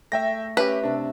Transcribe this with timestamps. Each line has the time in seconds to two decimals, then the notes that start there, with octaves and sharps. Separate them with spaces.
0.12 A3 E5 G5 A#6
0.57 C#4 G4 B4 E5
0.84 C3 D4 A5